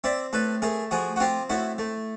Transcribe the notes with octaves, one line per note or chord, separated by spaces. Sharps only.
C4 D5 E5
A2 A4 B4
A3 G#4 A#4
F3 F#4 G#4
F#4
C4 F4 G4
A2 E4 F#4
A3